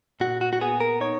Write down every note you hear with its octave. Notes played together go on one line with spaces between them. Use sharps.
A#2 F#4
F#4
F#4
B3 G#4
A#4
D#4 C#5